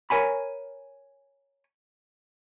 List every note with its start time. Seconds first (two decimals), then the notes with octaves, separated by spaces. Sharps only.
0.10 A#4 C#5 G#5 B5